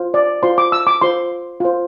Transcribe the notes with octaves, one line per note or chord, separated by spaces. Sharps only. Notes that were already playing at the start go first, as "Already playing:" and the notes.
Already playing: F4 C5
D5
F4 C5 C6
D6
E6
D6
F4 C5 C6
F4 C5